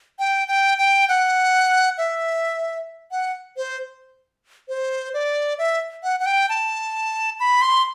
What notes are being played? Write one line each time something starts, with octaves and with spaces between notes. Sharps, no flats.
G5
G5
G5
F#5
E5
F#5
C5
C5
D5
E5
F#5
F#5
G5
A5
B5
C6